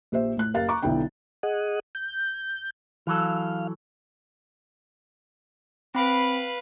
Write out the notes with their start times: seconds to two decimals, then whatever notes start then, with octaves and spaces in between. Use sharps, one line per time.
0.12 A#1 G4 C5 E5
0.37 A2 F#6
0.54 F#1 G4 A#4 F5 A6
0.69 A#5 C#6 D6
0.82 B1 D3 D#4 E4 G5
1.43 G#4 D#5 F#5
1.95 G6
3.07 E3 F#3 A4 F5
5.95 C4 B4 F5 B5 D7